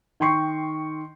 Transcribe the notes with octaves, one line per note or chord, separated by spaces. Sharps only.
D#3 G5 C6 C#6 C7